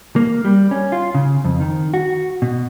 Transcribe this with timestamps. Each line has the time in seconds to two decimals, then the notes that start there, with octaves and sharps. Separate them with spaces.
0.16 A#3
0.45 G3
0.71 C#4
0.92 F4
1.15 C#3
1.45 F2
1.60 D#3
1.94 F#4
2.42 B2